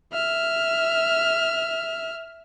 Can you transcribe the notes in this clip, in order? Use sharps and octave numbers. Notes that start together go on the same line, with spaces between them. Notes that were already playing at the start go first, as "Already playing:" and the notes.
E5 F6